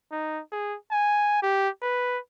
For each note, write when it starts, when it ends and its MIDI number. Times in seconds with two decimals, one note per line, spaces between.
0.12 0.41 63
0.52 0.76 68
0.91 1.42 80
1.43 1.69 67
1.82 2.19 71